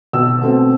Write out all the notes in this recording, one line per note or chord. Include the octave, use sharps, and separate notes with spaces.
B1 E6
B2 A3 C4